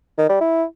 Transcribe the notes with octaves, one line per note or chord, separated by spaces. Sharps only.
D#3
G3
E4